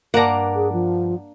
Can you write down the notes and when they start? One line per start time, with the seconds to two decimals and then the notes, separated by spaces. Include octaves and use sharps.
0.14 G2 A#3 D4 F#5 A#5
0.55 G#4
0.72 F3